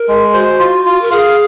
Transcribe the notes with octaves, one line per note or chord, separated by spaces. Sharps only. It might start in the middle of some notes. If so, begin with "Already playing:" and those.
Already playing: A#4
G#3
F#4 C5
F4
F4
A#4
G#4 F5